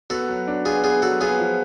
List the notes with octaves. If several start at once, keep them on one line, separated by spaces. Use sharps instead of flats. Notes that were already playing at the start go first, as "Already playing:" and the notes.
B3 F#4 A4
F#3
D4
B3 F4 G#4
B3 F4 G#4
F#3 F#4 A4
B3 F4 G#4
F3